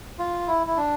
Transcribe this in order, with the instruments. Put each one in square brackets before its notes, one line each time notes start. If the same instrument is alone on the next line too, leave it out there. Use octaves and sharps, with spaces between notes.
[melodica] F4
E4
E4
D4